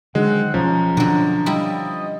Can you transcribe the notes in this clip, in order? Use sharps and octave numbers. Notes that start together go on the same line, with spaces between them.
D3 D#3 F#3 G#3 C4 F#5
B1 F3 G#3 C#4 A#5
B2 D3 F#3 D4
G3 A#3 E4 D#5